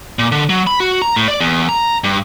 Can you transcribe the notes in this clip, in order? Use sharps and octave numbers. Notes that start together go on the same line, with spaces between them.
A#2
D3
F#3
B5
F#4
A#5
A2
D5
E2
A#5
G2